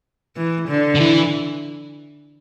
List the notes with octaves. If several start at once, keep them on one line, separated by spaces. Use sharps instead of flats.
E3
D3
D3
E3